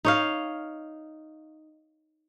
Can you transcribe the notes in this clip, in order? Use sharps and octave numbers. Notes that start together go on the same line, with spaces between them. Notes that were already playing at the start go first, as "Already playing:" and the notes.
D#4 C#5 F5